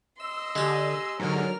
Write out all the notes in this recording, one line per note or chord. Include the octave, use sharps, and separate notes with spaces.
D#5 C6 E6
D3 G#3 G4
G#2 D3 F#3 A#4 F6